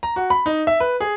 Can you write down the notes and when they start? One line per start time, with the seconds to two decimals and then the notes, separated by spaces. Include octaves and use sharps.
0.03 A#5
0.16 F#4
0.30 B5
0.46 D#4
0.67 E5
0.80 B4
1.01 G#4